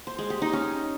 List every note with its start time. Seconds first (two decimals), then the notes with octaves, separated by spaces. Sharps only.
0.07 C5
0.18 G#3
0.30 G4
0.42 D#4
0.53 C#4